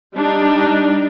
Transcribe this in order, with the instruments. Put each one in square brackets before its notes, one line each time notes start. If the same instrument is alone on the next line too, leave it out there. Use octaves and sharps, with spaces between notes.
[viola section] G3 D4 D#4